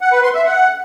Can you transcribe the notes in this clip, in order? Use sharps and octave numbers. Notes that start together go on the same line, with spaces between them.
F#5
B4
C6
E5
F#5